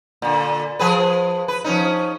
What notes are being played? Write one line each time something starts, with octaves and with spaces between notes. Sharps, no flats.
A#2 D3
F3 G#4 B4
B4
F3 C#4 D#4